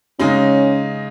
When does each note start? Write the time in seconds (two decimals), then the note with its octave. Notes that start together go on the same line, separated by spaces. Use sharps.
0.19 C#3 G#3 C#4 D#4